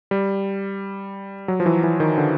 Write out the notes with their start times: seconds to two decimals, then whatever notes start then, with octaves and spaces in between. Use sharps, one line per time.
0.11 G3
1.48 F#3
1.60 F3
1.66 E3
1.83 E3
2.00 D#3
2.18 D3